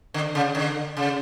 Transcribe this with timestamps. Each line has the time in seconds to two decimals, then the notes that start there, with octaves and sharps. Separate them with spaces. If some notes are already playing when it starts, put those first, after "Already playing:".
0.14 D3
0.35 C#3
0.55 D3
0.97 C#3